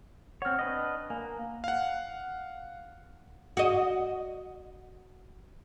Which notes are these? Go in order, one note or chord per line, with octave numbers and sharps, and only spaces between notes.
C4 C#5 F#5 F6
D4 B4 D#5
A#3 G#5
F5 F#5
F#4 D#5